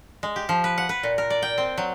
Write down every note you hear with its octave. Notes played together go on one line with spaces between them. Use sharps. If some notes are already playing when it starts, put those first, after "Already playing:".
G#3
G4
F3
B4
F#5
B4
A#2
A#4
D5
G5
C4
F#3